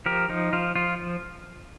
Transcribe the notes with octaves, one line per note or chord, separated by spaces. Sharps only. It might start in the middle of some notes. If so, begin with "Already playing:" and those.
F3 G4 A#4
F3 D#4
F3 F4
F3 F4